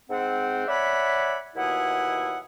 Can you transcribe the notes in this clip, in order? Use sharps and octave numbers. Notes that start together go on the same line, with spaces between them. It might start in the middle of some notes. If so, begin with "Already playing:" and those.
G#2 C4 F#5
C#5 D5 E5 F#5 G#5 B5
D#2 B2 E4 G#4 E5 F#5